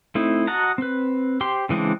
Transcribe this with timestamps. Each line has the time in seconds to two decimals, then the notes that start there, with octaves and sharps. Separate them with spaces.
0.15 A3 C4 D#4 E4
0.47 F#4 D#5 F#5 A5 A#5
0.78 C4 B4
1.41 G4 C5 C6
1.69 C#3 E3 G#3 C4 D4